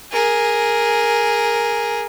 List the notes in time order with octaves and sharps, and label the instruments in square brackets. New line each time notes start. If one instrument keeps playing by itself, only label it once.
[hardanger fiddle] G#4 A#4